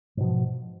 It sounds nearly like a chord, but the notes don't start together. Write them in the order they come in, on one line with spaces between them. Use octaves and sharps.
G#2 B2 F3